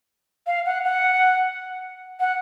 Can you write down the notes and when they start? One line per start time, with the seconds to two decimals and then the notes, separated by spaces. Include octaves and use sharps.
0.47 F5
0.66 F#5
0.84 F#5
2.20 F#5